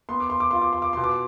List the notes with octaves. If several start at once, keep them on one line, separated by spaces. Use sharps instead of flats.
B3 C6
D6
C6
D6
F4 C6
D6
C6
D6
B2 C6
D6